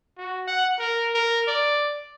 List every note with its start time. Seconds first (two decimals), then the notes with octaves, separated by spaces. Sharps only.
0.18 F#4
0.47 F#5
0.79 A#4
1.14 A#4
1.47 D5